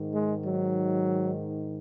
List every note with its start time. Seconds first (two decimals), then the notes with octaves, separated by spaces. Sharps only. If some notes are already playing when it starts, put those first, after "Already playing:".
Already playing: G#2 D#3
0.14 G#3
0.46 F#3